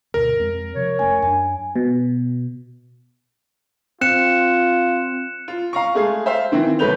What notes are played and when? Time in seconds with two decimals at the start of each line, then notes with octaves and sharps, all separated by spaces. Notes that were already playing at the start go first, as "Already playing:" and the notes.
0.14 D2 G2 B2 A#4
0.39 F2 G#3 C4
0.75 C3 F3 C#5
0.99 F1 A3 C#4 G#5
1.23 F#2 D4 G#5
1.76 B2
4.01 C4 F4 F#6 C#7 E7
5.48 F4
5.73 F5 A#5 C#6
5.94 G#3 A3 G#4 F5
6.26 C5 E5 F5
6.52 D#3 E3 C4
6.79 G1 C3 A3 B4 G6 F7